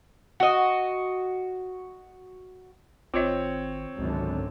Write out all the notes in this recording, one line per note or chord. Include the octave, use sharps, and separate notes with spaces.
F#4 D#5
G#1 C4 F4 C#5 D#5
G#1 C#2 F#2 D3